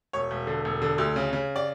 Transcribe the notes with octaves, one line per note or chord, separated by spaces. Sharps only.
E1 C#5
E1
D3
E1
D3
D2
C#3
C#3
D5